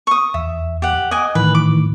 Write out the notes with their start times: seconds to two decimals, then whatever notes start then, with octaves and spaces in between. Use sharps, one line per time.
0.07 C#6 D#6
0.34 E2 E5
0.82 G4 F#5
1.11 D#5 F#5 G#5 D6
1.35 A2 D#3 E3 B4
1.55 D6